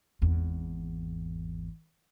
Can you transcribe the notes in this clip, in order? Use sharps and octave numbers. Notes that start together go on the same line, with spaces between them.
G#1 E2